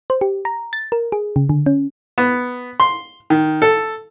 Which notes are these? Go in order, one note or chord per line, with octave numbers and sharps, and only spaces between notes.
C5
G4
A#5
A6
A#4
G#4
C#3
D3
C#4
B3
C6
D#3
A4